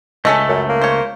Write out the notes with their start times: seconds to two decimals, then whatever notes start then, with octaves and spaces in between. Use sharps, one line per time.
0.25 C#2 A3 C#4 A4 D#5
0.49 F#2
0.69 A#3
0.81 C5 C#5